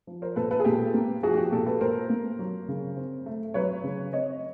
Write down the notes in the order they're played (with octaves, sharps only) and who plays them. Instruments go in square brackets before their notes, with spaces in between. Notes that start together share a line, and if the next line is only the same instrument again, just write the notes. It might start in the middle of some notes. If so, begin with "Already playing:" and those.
[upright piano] F3
A#4 C5
A#2 A4 B4
A4 B4
G#4
A#2 G4 A4
A#3
F3 F#4 G#4
F#4
G4
A#2 G4 A4
A4 B4
A#2 A#4 C5
A#3
F#3
C#3
C4
A3
F#3 B4 C#5
C#3
C4 C#5 D#5